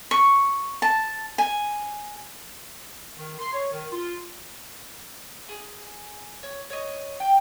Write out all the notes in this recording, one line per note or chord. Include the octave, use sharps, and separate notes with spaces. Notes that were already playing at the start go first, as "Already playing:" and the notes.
C#6
A5
G#5
D#3
C6
C#5
D#3
F4
G#4
C#5
C#5 D#5
G5